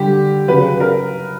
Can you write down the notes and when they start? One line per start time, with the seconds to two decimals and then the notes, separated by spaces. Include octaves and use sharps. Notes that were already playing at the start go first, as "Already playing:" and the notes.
Already playing: D3 G3 G4
0.48 C#3 F#3 B4
0.80 A#4